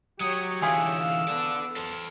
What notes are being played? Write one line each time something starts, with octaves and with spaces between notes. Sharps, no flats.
F#3 G4 C#5 D#6
D3 E3 E4 F4 G#4 E6
F5
B3 A4 D5
A4 C5